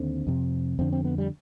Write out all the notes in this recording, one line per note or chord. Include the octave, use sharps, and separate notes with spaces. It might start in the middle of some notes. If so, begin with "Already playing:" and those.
Already playing: D#2 D3 C4
F2 C3
F2 D3 C4
C4
B3
G3